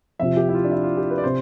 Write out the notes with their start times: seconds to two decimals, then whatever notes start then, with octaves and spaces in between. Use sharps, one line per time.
0.19 F2 C3 F3 E5
0.37 G4
0.49 E4
0.54 F4
0.64 D4
0.72 E4
0.84 F4
0.97 G4
1.11 B4
1.18 D5
1.24 C3 C5